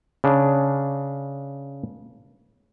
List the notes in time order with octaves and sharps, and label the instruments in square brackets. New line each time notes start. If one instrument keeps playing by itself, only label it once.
[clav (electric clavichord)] C#3 D4